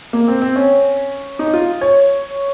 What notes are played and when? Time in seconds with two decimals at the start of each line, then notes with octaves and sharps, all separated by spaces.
0.13 A#3
0.28 C4
0.42 C4
0.56 C#4
1.39 D#4
1.54 F4
1.81 C#5